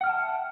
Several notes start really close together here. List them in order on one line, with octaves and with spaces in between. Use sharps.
F#5 F6 G5 A5 E5